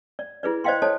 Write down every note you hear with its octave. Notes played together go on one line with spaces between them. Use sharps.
D5
E4 G#4 B4 D5
C5 D5 D#5 F5 G5 C6
A4 C5 C#5 D#5 A5